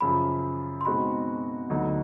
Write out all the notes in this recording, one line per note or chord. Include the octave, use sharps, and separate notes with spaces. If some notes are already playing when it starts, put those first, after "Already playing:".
F#2 C#3 F3 B5
C6
B2 G#3 C4 D#4 F#4 B5
D2 D3 F#3 B3 D#4